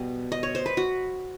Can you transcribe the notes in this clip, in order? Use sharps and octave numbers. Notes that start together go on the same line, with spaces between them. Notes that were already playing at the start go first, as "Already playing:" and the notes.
Already playing: B2 G3 B3
D#5
C#5
C5
B4
F#4